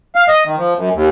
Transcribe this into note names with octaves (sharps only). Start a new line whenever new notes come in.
F5
D#5
D#3
F3
F#2
D#2